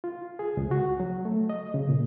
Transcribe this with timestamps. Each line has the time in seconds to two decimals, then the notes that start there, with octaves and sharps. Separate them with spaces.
0.04 F4
0.39 G#4
0.57 C#2
0.71 F#4
1.00 F#3
1.25 A3
1.49 D#5
1.74 C#3
1.89 A#2